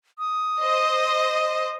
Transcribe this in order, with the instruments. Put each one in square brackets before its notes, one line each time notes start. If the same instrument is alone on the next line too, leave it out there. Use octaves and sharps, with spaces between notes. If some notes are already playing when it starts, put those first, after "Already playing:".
[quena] D#6
[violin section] C5 D#5